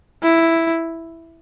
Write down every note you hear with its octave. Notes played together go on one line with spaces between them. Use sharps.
E4